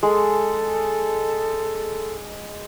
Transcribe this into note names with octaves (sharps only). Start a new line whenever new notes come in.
G#3 A4